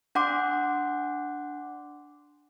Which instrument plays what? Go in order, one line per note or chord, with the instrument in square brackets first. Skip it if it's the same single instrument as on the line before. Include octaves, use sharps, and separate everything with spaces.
[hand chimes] D4 F#5 C6 D6